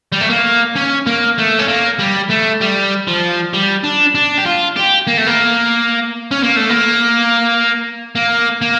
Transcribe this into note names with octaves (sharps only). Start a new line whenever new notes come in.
G3
A3
A#3
C#4
A#3
A3
C#4
A#3
G3
A3
G3
F3
G3
D4
D4
G4
F4
G4
A#3
A3
A#3
C#4
A#3
A3
A#3
A#3
A#3